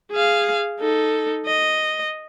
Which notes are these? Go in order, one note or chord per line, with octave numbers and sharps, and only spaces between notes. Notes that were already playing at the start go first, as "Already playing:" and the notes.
G#4 F5
D#4 A4
D#5